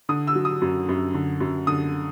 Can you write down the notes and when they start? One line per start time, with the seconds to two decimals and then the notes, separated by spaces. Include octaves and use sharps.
0.09 D3 D#6
0.27 E6
0.35 F#3
0.45 D#6
0.62 F#2
0.89 F#2
1.14 D3
1.41 F#2
1.67 D3 D#6